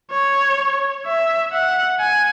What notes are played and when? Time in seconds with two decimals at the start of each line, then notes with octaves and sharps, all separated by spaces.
0.11 C#5
1.06 E5
1.53 F#5
2.00 G#5